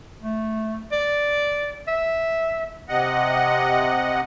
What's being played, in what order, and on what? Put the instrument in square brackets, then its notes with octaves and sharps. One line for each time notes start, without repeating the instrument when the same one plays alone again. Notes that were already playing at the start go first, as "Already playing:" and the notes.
[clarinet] A3
D5
E5
[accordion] C3 D#5 F#5